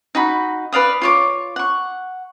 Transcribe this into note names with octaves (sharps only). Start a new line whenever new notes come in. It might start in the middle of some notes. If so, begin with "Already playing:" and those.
D#4 F#4 B5
B4 D5 F5 D#6
F4 C#5 D6
F#5 C#6